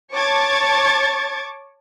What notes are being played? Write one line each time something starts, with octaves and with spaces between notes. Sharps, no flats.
C#5 A5 C#6 D6 G#6 A6